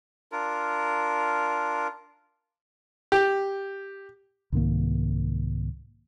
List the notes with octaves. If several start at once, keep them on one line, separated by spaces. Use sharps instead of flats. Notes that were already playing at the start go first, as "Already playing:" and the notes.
D4 F4 A#4
G4
C2 G#2 D#3 A#3